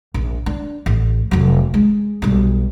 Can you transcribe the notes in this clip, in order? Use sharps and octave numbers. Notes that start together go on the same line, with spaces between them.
A#1
D4
A1
F1 F#3
G#3
B1 G3